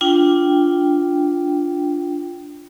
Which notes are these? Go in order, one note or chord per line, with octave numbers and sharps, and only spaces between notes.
D4 F4 G5